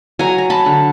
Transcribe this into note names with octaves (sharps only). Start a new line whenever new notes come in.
F#3 G#5 A#5
A#5
A5 B5
D3